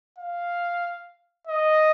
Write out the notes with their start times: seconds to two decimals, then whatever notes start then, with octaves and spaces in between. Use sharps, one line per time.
0.18 F5
1.47 D#5